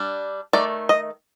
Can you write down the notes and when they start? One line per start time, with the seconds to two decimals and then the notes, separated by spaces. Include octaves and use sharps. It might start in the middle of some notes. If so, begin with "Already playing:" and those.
Already playing: G3 D4
0.53 D#3 A3 D5
0.89 D#5